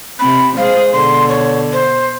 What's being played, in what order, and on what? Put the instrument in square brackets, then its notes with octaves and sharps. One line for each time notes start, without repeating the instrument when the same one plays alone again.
[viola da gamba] C3 C4 [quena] B5
[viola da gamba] G#3 G#4 [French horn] C5 [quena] F5
[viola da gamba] B2 [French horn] D3 [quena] C6
[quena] C#5
C5